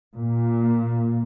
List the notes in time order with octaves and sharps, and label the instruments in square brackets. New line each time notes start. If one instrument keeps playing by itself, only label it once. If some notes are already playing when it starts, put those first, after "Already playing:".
[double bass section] A#2